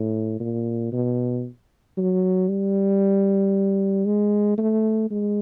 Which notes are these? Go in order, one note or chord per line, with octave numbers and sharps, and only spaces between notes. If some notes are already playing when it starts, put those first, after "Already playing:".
Already playing: A2
A#2
B2
F#3
G3
G#3
A3
G#3